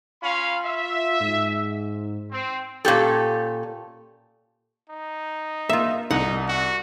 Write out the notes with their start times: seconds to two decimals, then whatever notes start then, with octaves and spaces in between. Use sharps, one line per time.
0.22 C#4 F4 F5 B5
0.65 E5
1.20 G#2
2.32 C4
2.85 A#2 C#4 G4 A4
4.90 D#4
5.69 A#3 F4 E5
6.11 C2 D#4 F#5
6.48 F#4